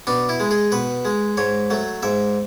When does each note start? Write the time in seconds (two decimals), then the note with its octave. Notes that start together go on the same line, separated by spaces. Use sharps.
0.07 B2 D4
0.29 E4
0.40 G#3
0.51 G#4
0.72 B2 B4
1.05 G#3
1.37 G#2 C#5
1.70 F#3 A3
2.03 G#2 E5